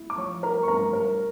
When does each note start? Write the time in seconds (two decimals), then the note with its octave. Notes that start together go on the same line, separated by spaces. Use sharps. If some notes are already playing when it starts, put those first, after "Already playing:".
Already playing: E4
0.10 D6
0.18 F3 C#5 C#6
0.43 E4 A#4 A#5
0.63 C#6
0.68 G2 A#4 A#5
0.93 G3 A#4 A#5